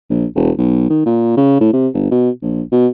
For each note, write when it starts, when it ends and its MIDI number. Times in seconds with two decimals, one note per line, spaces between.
0.10 0.26 34
0.35 0.51 28
0.58 0.86 35
0.90 1.03 51
1.06 1.36 46
1.37 1.59 49
1.60 1.71 45
1.73 1.88 48
1.94 2.07 31
2.11 2.30 47
2.42 2.62 34
2.72 2.88 47